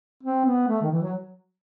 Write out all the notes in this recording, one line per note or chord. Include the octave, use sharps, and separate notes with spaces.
C4
B3
A3
D#3
E3
F#3